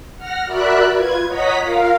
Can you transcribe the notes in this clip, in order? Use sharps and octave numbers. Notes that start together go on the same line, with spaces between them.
F#5 F6 A#6
F#4 A#4 D5 E5 B5 F#6
F4 B4 G#6
C#5 D#5 F#5 A#5 D#6 B6
F4 A#4 F5